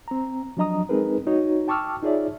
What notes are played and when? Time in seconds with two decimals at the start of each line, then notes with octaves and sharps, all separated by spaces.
0.08 C4 A#5
0.57 F3 F#3 D4 D#5 A#5 D#6
0.89 G#3 C4 D#4 G#4 A#4 B4
1.27 D#4 F#4 C#5
1.68 G5 A5 C#6 D6 E6 F6
2.02 D#4 F4 G#4 C#5 D5 E5